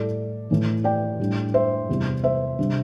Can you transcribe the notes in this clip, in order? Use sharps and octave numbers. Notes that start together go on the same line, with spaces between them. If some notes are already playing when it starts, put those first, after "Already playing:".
Already playing: A2 G3 E4 A4 D5
A2 E3 A3
D5 G5
A2 G3 D4
C5 E5
E2 C3 G3 C4 E4
C5 E5
C3 G3 D4